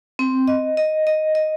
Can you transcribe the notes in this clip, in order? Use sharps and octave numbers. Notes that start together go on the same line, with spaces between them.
C4
D#5
D#5
D#5
D#5